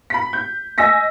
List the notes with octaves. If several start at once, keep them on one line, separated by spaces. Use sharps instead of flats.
B5 B6
G6
D#5 G#5 E6 A#6 B6